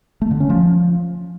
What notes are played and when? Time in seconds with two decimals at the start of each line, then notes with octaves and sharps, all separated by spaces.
0.22 A3
0.31 D3
0.40 C#4
0.50 F3